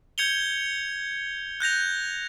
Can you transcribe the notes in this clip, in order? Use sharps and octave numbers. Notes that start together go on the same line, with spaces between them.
G6 G#6 C#7 F7 G7
F#6 G6 A#6 F7